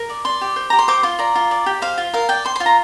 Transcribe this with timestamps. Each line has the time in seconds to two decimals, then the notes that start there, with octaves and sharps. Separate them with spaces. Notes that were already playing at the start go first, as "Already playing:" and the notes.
Already playing: A#4
0.09 D5
0.25 D5 C6
0.41 G4
0.56 C5
0.70 G4 A#5
0.79 C6
0.88 C5 D6
1.03 F4 C6
1.19 D5 A#5
1.35 F4
1.51 D5
1.66 G4
1.82 C5 F5
1.98 F4
2.14 A#4 F5
2.29 D5 G5
2.45 C5 C6
2.56 F4 C6
2.66 A#5